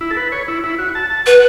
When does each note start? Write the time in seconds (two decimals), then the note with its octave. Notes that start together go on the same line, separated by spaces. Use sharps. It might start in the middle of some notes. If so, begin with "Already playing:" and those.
0.01 E4
0.11 A4
0.17 B4
0.32 C#5
0.48 E4
0.64 E4
0.78 F#4
0.95 A5
1.10 A5
1.26 B4 F#5